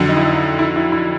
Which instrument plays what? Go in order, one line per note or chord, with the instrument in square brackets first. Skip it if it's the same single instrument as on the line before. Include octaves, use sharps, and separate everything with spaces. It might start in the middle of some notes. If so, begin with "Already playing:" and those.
Already playing: [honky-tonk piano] F2 D3 F#3
[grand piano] D#4
E4
E4
E4
E4